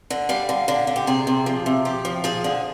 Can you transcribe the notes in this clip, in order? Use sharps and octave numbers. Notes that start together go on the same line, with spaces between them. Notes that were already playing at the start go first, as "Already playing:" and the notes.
D3
G3 F5
D3
D3
D3
G4
C3 G#4
C3
F3
C3
F3 G4
F3
F3 G#4
D3